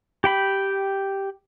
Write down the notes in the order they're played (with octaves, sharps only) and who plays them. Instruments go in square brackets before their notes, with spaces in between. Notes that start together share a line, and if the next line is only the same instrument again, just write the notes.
[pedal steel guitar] G4 G5 B5